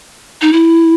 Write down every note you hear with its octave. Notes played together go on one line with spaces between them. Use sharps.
D#4
E4